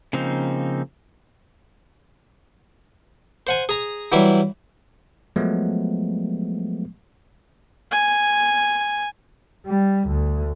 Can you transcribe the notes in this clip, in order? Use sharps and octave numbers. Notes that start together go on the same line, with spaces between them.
C#3 F3 A#3 C4 D#4
C5 F#5 G#5
G#4 A#5
E3 F#3 G3 E4
F3 F#3 G#3 A3 B3
G#5
G3
D2